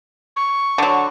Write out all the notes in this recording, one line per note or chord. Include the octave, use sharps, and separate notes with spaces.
C#6
D3 F#3